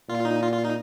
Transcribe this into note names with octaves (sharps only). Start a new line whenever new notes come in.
A#2 F4
D#4
F4
F4
D#4